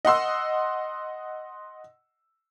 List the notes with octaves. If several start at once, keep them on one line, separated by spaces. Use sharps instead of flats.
D#5 F#5 C6 E6